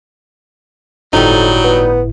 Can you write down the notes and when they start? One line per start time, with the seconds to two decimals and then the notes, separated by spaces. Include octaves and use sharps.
1.13 G1 F2 A2 F#3 G3 D#4 E4
1.64 B3